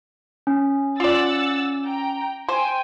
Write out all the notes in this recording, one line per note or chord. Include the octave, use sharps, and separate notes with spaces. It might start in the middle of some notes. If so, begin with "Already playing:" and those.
C#4
F4 D5 F#5 E6 A6
G5 A#5
C5 G5 G#5